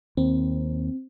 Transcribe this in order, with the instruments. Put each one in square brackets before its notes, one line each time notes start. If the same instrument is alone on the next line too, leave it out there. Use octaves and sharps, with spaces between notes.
[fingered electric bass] D#2 [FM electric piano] C4